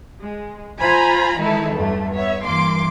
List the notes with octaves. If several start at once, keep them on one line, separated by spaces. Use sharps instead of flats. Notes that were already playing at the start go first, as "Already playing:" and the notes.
G#3
F4 C5 G#5 A#5 B5
D#3 E3 G#3 D#4 E4 A4
B1 E2 G2 G3 A3
B3 C#5 E5
G2 E3 A#3 C6 D6